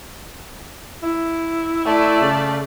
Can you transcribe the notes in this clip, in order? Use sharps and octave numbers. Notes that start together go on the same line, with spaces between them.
E4
A3 D5
C#3